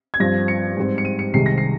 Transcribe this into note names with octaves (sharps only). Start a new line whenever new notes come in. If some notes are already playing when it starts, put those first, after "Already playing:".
G#6
G2 F3 C4 A#6
C#7
G#2 G3 C4
C#7
D#7
C#7
C2 C3 D#3 G#3 D#4 C7
A#6
C7